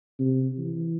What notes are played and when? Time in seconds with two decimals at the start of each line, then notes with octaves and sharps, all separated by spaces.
0.19 C3
0.58 E3